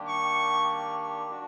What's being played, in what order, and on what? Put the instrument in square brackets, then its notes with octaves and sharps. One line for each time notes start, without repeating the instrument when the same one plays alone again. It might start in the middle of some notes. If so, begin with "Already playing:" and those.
Already playing: [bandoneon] D#3 G3 A#3 D4 G4
[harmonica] C#6
[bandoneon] D4 F#4